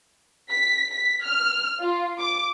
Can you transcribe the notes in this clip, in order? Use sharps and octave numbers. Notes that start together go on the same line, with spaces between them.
B6
B6
F6
F4
D6